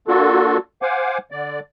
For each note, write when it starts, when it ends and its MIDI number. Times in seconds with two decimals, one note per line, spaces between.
0.08 0.57 58
0.08 0.57 62
0.08 0.57 65
0.08 0.57 66
0.08 0.57 69
0.82 1.18 72
0.82 1.18 77
0.82 1.18 78
0.82 1.18 80
0.82 1.18 86
1.31 1.59 50
1.31 1.59 74